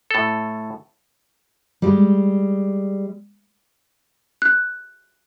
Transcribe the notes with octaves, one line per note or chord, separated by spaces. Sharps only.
A2 A4
G3 G#3
F#6